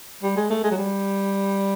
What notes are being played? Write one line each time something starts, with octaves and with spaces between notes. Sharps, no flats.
G3
G#3
A3
G#3
F#3
G3